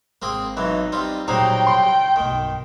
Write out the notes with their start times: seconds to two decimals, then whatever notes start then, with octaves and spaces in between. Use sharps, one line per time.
0.22 G#1 A#3 C4 G#4
0.57 B1 E3 F#3 D#4
0.92 G3 C4 F4
1.28 A#2 F#3 G3 D#4 G#4 C5 G5 A#5
1.67 C#3 C6
2.16 B1 G2 D#3